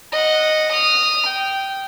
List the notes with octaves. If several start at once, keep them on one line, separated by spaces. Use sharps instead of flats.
D#5 F#5
D#6 F6
G5